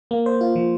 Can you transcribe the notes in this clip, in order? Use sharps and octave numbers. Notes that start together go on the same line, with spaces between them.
A#3
C5
F4
F3